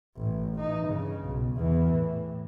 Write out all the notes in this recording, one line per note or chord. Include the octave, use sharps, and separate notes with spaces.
A1 G2
E3 D#4
G2 C#3
B1
E2 E3
A2